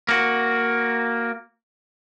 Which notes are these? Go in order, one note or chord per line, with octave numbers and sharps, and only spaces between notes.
A#3 F#4